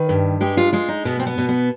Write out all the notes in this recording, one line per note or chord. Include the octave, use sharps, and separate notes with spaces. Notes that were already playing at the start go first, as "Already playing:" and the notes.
Already playing: D#3 B4
G2
G#3 G4
F4
G#3 F4
D#4
B2 B3
C4
B3
B2
B3